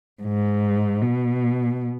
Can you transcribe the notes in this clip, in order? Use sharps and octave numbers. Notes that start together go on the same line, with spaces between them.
G#2
B2